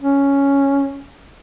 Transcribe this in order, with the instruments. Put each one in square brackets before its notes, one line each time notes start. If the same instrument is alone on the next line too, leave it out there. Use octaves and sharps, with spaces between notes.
[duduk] C#4